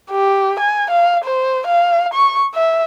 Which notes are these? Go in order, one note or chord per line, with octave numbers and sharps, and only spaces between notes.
G4
G#5
F5
C5
F5
C#6
E5